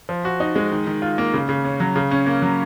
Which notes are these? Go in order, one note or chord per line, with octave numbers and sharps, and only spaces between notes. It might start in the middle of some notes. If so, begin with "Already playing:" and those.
F3
F#4
D#4
G#3
D#3
D#3
F4
A#3
C#3
C#3
C#4
F#3
C#3
C#4
A#3
F#3